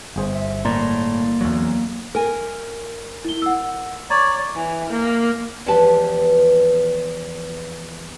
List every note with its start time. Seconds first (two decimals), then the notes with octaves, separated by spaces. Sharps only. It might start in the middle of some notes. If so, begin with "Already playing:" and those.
0.16 G1 G#4 C5
0.34 E5
0.65 A2 A#3 D5 A#5 C6
1.41 E2 F#3
2.15 A#4 G#5
3.24 E4 G7
3.42 F#5 E6
4.10 C#5 D5 A#5
4.55 E3
4.90 A#3
5.66 E2 F3 G#3 G4 B4 A5